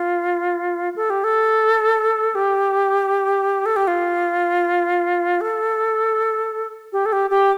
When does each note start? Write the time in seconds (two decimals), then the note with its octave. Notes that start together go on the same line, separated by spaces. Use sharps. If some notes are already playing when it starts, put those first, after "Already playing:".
Already playing: F4
0.96 A4
1.10 G4
1.24 A4
2.35 G4
3.66 A4
3.76 G4
3.87 F4
5.41 A4
6.93 G4
7.06 A4
7.13 G4
7.30 G4